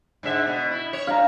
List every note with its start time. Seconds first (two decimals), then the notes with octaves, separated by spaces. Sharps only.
0.23 G#2 D3 E5
0.47 B2
0.71 E4
0.93 C#5
1.07 G2 F5 A#5